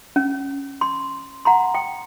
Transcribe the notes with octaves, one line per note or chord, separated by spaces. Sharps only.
C#4
C6
F#5 A#5 C6
G5